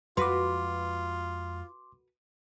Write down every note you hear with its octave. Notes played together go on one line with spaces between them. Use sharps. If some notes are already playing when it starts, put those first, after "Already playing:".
F2 G#3 F4 F#4 B4 C6 D6